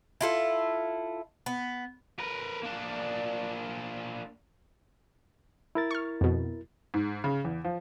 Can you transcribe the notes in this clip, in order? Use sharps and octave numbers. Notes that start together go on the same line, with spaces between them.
E4 F4 A4
B3
A#4 B4
A#3 D4
E4 A#4 A6
C#6 F6
F2 B2
G#2
C#3
E2
F3